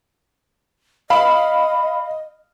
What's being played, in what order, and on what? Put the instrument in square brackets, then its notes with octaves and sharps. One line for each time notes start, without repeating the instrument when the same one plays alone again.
[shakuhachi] D#5 [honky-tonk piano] F5 B5